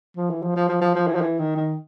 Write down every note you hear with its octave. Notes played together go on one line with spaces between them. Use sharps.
F3
E3
F3
F3
F3
F3
F3
E3
F3
E3
D#3
D#3